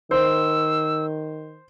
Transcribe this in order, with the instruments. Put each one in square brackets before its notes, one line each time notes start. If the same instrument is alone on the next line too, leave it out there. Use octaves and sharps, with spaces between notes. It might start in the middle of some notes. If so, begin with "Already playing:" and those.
[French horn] D#3 [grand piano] C5 [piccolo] E6